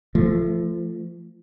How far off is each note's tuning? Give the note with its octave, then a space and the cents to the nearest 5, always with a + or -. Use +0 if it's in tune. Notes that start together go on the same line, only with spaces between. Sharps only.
F3 -30 A3 +0